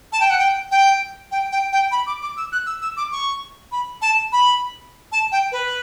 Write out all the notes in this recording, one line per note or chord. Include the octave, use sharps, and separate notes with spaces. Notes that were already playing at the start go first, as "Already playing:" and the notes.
A5
G5
F#5
G5
G5
G5
G5
G5
B5
D6
D6
E6
F#6
E6
E6
D6
C#6
B5
A5
B5
A5
G5
B4